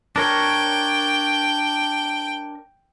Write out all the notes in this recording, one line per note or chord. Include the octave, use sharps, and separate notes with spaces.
D4 A#4 C#5 G5